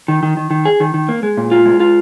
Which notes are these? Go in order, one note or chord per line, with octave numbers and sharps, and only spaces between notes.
D#3
D#3
D#3
D#3
G#4
D#3
D#3
A#3
G#3
A#2
F4
G#3
F4